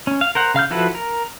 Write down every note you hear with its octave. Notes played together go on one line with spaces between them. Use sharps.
C#4
F5
A#4 C5 F#5
C#3 F5 F6 G6
F3 E4 F#4 A4 B4
A#4